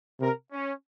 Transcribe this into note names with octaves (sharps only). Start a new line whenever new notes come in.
C3 A#4
C#4